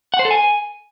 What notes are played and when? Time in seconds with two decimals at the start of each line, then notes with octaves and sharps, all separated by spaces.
0.14 F#5
0.19 C5
0.25 A4
0.31 G#5